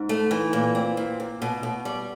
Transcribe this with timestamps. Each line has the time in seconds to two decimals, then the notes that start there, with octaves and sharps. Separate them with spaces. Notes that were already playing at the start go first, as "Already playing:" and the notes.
Already playing: G#2
0.09 A3
0.31 E3
0.53 A#2
0.75 C4
0.97 A#2
1.20 A#2
1.42 B2
1.63 B2
1.85 G3